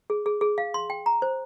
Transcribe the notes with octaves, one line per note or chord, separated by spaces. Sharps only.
G#4
G#4
G#4
F5
C6
G5
A#5
C5